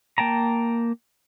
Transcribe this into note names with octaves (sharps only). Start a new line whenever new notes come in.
A#3 G5 A5 A#5